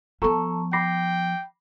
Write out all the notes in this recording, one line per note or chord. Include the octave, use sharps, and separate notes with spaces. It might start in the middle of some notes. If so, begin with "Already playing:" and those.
F3 B3 A4 A5 A#5 C#6
G5 B5 D6 A#6 C7